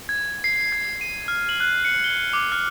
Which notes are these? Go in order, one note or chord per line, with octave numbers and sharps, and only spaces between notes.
G#6
C7
G#6
D#7
F6
F#7
F#6
C#7
G7
D6
F6